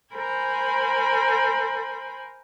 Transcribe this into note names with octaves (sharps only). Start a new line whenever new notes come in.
A#4 C5 G#5 B5